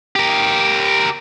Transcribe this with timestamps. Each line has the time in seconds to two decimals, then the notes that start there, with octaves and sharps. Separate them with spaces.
0.16 G4 A#4